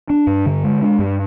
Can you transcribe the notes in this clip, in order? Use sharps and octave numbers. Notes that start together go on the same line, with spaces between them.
D4
G2
D3
G#3
D4
G2